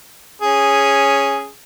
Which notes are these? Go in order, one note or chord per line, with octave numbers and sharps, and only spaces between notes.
C#4 G#4